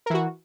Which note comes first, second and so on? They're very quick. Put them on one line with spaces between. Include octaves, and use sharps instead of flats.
A#4 E3 F#4